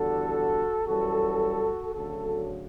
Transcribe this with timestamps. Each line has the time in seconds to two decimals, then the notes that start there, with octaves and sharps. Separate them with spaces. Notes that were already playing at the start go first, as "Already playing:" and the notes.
Already playing: E2 D3 G3 F#4 A4
0.86 F#2 E3 G3 F#4 A4
1.94 D2 C#3 F#3 F#4 A4